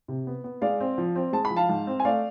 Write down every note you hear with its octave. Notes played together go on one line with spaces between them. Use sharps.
C3
B3
B3
G#3 D5 F5
C4
F3
C4
G#3 A5
B5
F3
F5 A5
G#2
C4
G#5
A3 D5 F5